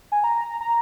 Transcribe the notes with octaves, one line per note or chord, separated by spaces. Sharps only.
G#5
A#5
A#5